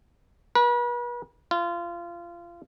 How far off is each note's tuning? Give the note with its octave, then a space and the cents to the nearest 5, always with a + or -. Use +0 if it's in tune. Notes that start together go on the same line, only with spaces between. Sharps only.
B4 -40
F4 -25